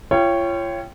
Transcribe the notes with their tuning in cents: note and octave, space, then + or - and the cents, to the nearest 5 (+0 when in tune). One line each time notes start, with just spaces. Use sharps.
F4 -35 C#5 +0 G5 +0